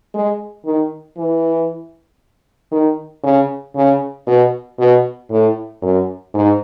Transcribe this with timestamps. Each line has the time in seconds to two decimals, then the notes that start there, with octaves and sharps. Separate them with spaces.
0.14 G#3
0.65 D#3
1.17 E3
2.72 D#3
3.24 C#3
3.75 C#3
4.27 B2
4.79 B2
5.30 A2
5.82 F#2
6.34 G#2